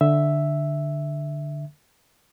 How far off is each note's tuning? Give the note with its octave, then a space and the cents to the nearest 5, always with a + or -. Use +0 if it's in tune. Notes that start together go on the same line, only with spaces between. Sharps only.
D3 +5 E5 +0